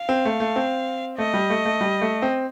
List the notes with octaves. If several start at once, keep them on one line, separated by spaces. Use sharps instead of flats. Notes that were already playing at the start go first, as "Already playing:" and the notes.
Already playing: F5
C4
A3
A3
C4
A3 D#5
G3
A3
A3
G3
A3
C4